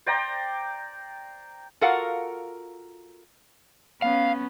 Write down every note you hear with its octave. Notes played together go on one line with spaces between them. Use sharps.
C5 D5 G5 A#5
F4 F#4 A4 A#4 F5 F#5
B3 C#4 F5